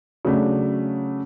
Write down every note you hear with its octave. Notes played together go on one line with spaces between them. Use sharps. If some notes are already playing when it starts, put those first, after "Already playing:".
C#3 F#3 A3 D4